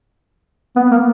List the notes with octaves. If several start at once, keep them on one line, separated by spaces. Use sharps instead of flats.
B3
A#3